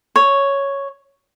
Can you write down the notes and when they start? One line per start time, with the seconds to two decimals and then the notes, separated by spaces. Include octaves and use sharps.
0.16 C#5